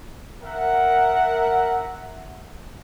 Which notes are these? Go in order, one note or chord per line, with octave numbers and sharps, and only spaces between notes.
A#4 E5 F#5